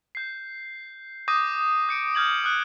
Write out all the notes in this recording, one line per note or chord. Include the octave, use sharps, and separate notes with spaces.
G6 C7
D6 D#6 G6 A#6 D#7
G6 C#7 D7
F6 G6 G#6 F#7
D#6 F#6